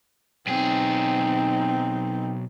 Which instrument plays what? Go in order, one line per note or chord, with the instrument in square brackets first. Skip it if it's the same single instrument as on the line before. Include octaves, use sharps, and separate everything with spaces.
[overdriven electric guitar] B1 G#4 [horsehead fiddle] C4 D#4